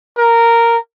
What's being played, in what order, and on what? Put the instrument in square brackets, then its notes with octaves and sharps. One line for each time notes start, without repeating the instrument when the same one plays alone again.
[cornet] A#4